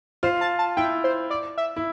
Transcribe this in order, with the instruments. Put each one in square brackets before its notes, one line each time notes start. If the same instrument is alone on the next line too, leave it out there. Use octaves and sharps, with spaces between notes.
[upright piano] F4 [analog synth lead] C5
[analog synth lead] A5
A5
[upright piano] E4 [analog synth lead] G5
[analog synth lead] C5
D5
E5
[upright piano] E4